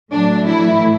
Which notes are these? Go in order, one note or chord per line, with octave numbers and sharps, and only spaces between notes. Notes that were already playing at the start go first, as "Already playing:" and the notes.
A2 F#3 A3 D4
E3 E4